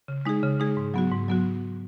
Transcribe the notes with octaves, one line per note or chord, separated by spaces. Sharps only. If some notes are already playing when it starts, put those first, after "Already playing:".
C#3
G#3 D#4 G#4
C#3
G#3 D#4 G#4
G#2
F#3 B3 F#4
G#2
F#3 B3 F#4